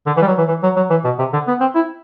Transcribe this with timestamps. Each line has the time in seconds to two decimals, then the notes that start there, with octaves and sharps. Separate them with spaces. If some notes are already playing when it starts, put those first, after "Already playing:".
0.06 D3
0.17 E3
0.22 G3
0.27 F#3
0.38 E3
0.48 E3
0.63 F#3
0.76 F#3
0.90 E3
1.04 B2
1.19 C3
1.33 D3
1.47 B3
1.60 C4
1.75 E4